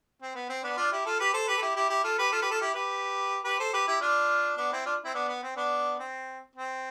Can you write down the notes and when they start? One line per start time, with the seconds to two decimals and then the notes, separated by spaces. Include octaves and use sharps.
0.22 C4
0.35 B3
0.49 C4
0.63 B3 D4
0.77 D4 F4
0.92 E4 G4
1.06 F4 A4
1.20 G4 B4
1.33 A4 C5
1.48 G4 B4
1.57 A4
1.62 E4 G4
1.76 E4 G4
1.90 E4 G4
2.04 F4 A4
2.18 G4 B4
2.32 F4 A4
2.42 G4 B4
2.51 F4 A4
2.61 E4 G4
2.74 G4 B4
3.45 G4 B4
3.59 A4 C5
3.73 G4 B4
3.87 E4 G4
4.01 D4 F4
4.57 B3 D4
4.72 C4 E4
4.86 D4 F4
5.04 C4 E4
5.15 B3 D4
5.28 B3
5.43 C4
5.56 B3 D4
5.99 C4
6.55 C4